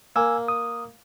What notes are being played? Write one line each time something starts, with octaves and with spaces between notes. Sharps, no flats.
A#3 G#5 E6
D#6